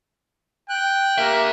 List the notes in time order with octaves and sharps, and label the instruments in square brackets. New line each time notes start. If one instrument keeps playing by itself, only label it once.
[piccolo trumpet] G5 [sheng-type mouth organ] F#6
[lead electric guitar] D3 E5 [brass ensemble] A#3 G4 A#4